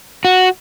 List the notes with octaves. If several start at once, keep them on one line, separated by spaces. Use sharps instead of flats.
F#4